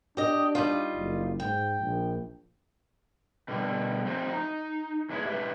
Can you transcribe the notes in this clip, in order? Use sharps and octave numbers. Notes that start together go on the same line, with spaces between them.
D4 G4 D#5
G3 D#4 F4
F#1
G#2 G5
A#1
B2 D3 G3
F3 A3 C4 D#4 F#4 C5
D#4
E2 E3 G#3 E4 C#5
G#3 G4 B4 E5